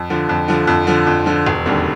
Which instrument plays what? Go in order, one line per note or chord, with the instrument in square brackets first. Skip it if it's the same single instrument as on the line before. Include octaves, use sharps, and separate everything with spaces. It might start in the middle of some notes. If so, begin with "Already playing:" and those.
Already playing: [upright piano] F2
D3 F3
F2
D3 F3
F2
D3 F3
F2
D3 F3
E1
D#2 D3 G3 C4